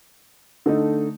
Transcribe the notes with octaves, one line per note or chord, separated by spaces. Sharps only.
D3 A3 D#4